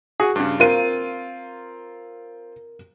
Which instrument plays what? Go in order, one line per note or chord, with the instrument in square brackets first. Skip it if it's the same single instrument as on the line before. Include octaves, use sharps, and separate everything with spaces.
[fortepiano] F#4 G#4
G2 C#3
[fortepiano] C4 F4 [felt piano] A#4 D#7